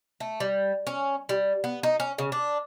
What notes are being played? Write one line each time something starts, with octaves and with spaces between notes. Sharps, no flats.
A3
G3
C#4
G3
B3
D#4
C#4
C#3
D4